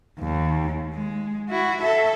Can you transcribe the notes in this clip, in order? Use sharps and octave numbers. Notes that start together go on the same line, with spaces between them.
D#2
G#3
E4 F#4
A4 E5